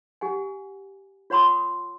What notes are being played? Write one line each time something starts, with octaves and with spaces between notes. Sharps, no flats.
G4 F#5 G#5
F4 C#5 F#5 B5 C6 D#6